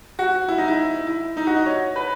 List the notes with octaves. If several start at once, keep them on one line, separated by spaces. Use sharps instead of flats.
F#4
E4
D#4
E4
E4
D#4
F#4
D#5
C#5
B4